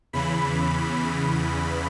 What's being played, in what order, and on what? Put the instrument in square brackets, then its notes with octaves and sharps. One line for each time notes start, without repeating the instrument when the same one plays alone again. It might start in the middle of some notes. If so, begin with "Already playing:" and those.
[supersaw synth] E2 C#3 E3 B5